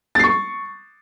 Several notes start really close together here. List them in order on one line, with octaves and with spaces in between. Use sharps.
A6 C7 C#6